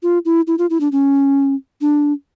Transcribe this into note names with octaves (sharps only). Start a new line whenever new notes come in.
F4
E4
E4
F4
E4
D4
C#4
D4